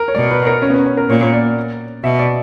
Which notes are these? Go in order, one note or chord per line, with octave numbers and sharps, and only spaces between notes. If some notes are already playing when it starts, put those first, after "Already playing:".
Already playing: A#4
C#5
B2 D5
B4
A#4
C#4
B3
C#4
C#4
A#4
A#2 C#5
C#5
D5
B2 E5
D5